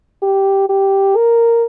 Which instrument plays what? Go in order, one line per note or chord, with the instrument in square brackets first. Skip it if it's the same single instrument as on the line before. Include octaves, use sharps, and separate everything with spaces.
[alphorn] G4
G4
A#4